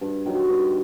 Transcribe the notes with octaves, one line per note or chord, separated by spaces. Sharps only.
G2
D#3 F#3
G2